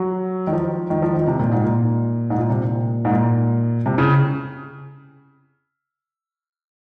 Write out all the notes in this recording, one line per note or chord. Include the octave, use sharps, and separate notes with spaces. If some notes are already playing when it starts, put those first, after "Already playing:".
Already playing: F#3
D#3
F3
D#3
F3
D#3
C3
A#2
G#2
A#2
G#2
A#2
C3
A#2
G#2
A#2
C3
C#3